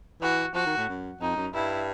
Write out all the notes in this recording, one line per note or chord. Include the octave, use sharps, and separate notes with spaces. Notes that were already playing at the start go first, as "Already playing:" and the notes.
E3 F#4
F3 F#4
D#3
A2
F#2
F2 D#4
F#2
G2 E4